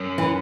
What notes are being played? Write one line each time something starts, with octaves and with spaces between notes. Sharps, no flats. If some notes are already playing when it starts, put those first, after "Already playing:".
Already playing: F#2
E3